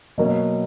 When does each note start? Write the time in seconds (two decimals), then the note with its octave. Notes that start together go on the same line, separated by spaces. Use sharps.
0.18 B2 F#3 A#3